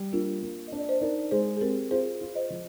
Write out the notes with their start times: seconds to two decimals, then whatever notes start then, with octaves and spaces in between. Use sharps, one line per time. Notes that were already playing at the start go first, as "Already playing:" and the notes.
Already playing: G3
0.13 A#3 D4 F4
0.42 A#3
0.68 D4 D#5
0.79 D5
0.89 C5 D#5
1.01 D#4 A#4 D5
1.31 G#3 G#4 C5
1.57 G#4
1.61 C4 G4 A#4
1.91 F4 G#4 C5
2.21 F4
2.35 C5 D#5
2.50 F3